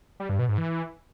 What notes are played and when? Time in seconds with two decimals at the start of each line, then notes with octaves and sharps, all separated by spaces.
0.20 G3
0.29 G2
0.39 B2
0.48 G#2
0.58 E3